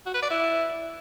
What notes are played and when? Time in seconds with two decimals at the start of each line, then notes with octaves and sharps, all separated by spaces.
0.06 F#4
0.14 B4
0.22 D5
0.30 E4